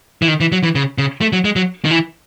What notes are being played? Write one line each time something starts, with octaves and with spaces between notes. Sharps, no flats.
E3
D#3
E3
F#3
E3
C#3
C#3
A3
F#3
G#3
F#3
D#3
E3